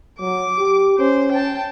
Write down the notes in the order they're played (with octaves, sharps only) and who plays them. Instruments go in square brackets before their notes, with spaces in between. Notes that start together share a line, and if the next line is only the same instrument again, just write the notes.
[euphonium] F#3 [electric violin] D6
[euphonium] G4
[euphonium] C#4 [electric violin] C5
[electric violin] G5 A5